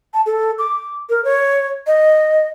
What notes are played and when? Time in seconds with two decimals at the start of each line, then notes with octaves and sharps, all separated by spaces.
0.14 A5
0.26 A4
0.59 D6
1.10 A#4
1.25 C#5
1.87 D#5